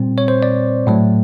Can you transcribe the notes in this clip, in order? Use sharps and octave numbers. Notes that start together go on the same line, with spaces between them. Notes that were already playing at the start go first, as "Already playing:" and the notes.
Already playing: A#2 G3 C4
C#5
C5
D5
A2 F#3 A3